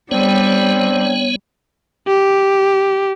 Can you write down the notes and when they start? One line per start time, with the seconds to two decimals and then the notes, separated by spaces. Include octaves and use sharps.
0.11 G3 B3 C4 D4 C#5 G5
2.08 G4